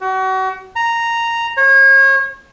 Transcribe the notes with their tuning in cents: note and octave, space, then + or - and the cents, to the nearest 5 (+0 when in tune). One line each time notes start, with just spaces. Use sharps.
F#4 +35
A#5 -5
C#5 -35